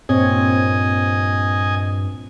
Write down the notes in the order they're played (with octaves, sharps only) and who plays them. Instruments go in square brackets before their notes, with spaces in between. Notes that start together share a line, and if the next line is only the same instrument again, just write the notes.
[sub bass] G2 [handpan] A#2 C4 C#5 [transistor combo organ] D#5 G#5